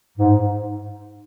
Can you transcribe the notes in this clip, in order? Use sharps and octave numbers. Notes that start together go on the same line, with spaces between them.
G#2